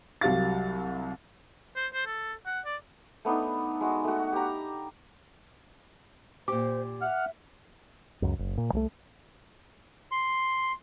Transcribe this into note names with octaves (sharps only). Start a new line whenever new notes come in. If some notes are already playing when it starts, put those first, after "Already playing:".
C2 F#3 G4 F5 A6
C5
C5
A4
F#5
D5
A3 B3 D4 D#4
G#3 F#4
A3 F#4
G4 A#5
A#2 G4 C5 D6
E5 F#5 F6
C#2 F#2
F#1
A#2
C2 G3 A3
C6